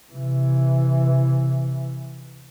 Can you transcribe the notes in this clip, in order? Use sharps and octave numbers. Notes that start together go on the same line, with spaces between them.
C3 E3